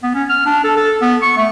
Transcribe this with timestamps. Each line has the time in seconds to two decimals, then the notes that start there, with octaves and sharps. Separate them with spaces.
0.03 B3
0.14 C#4
0.30 F6
0.46 D4
0.64 A4
0.77 A4
1.02 B3
1.22 C#6
1.37 A3